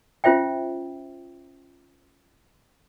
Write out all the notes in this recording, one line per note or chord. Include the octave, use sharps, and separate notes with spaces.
C#4 F4 C5 E5 G5